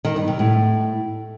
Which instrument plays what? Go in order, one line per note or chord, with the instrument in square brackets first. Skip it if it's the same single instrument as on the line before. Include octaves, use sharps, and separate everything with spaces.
[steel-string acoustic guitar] D#3
G2
C3
A2